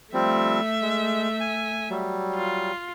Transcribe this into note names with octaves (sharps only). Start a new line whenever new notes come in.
F3 G3 A3 C4 E5
G#3
G#5
F#3 G3
F4